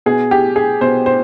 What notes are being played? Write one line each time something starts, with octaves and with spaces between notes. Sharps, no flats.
B2 G#4
G4
G#4
B2 C5
C5